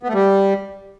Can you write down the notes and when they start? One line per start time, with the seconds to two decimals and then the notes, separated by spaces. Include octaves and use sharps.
0.03 B3
0.08 A3
0.14 G3